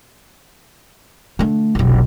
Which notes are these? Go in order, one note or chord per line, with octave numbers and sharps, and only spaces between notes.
D3 A3
F1 B1